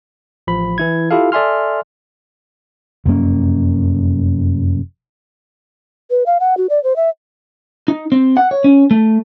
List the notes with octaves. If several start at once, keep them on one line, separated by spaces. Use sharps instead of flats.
A1 F3 B5
E3 E4 G#6
E4 F4 G4 A4 F5
A4 D5 E5 G#5 C6 F6
F1 F#2 A#3 C#4
B4
F5
F#5
F#4
D5
C5
E5
D#4
C4
F#5
C#5
C#4
A3